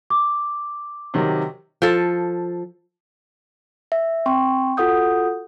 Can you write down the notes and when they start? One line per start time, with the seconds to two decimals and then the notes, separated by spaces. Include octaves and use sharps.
0.10 D6
1.14 C3 D#3 F#3
1.82 F3 A4
3.92 E5
4.26 C4 G5 C6 C#6
4.77 F4 F#4 A4 F#5 D#6 G6